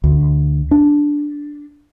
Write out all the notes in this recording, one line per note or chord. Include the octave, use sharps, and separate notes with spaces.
D2
D4